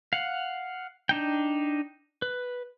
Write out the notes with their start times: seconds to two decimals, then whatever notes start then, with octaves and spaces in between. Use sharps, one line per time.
0.13 F5 F#5
1.09 D4 D#4 G5
2.22 B4